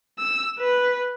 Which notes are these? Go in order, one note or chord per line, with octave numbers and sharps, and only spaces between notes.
E6
B4